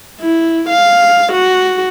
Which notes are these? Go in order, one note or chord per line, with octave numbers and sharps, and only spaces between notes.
E4
F5
F#4